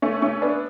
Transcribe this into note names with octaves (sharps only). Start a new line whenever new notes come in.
A3 C#4
A3 C#4
B3 D4